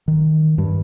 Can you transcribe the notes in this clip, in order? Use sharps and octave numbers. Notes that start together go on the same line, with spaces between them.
D#3
G2